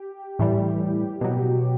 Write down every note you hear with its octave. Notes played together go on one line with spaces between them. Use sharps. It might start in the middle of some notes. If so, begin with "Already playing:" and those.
Already playing: G4
A2 E3 G3
B2 F#3